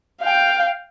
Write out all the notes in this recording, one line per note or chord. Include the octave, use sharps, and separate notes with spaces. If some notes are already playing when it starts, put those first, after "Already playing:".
F5 G5